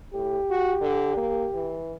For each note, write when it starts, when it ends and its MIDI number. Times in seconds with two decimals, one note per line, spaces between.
0.14 0.38 45
0.14 1.78 67
0.50 0.75 66
0.81 1.13 50
1.17 1.48 58
1.54 1.94 52